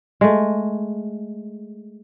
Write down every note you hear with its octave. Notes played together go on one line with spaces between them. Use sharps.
G#3 A3